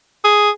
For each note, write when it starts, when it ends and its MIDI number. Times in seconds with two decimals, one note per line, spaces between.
0.24 0.50 68